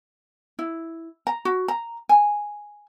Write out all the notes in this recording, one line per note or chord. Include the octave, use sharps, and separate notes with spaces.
E4
A#5
F#4
A#5
G#5